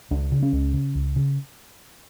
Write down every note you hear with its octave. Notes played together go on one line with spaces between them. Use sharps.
C#2 D4
C#3
C#4
C#2
C#3
C#2
C#3